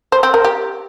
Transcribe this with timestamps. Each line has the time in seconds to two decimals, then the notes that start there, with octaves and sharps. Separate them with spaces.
0.12 C5
0.23 C4
0.34 A#4
0.44 G4